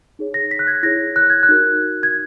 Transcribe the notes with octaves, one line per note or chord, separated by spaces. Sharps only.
D#4 G#4 C#5
A#6
B6
F#6
G#6
E4 G#4 C#5 A#6
F#6
G#6
F#6
D#4 F#4 A#4
G#6